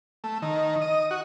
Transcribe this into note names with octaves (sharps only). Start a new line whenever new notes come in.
A3
D#3
D#5
F#4